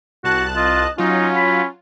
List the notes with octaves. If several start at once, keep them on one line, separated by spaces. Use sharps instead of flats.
C2 F#4 A5 F#6
F4 D#5
F#3 C#4 D#4 F4
B5